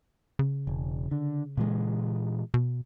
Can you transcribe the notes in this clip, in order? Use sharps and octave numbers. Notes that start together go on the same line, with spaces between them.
C#3
E1
D3
A#2 E3 G#3
B2